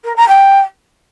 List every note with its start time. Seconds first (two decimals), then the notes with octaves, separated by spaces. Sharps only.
0.04 A#4
0.16 A#5
0.28 G5